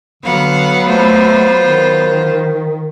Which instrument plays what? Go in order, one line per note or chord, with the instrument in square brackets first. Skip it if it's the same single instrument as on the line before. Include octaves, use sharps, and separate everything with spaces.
[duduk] D3 [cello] F#3 B3 [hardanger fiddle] F5 F#5
[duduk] A3 [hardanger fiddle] F4 C5
[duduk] D#3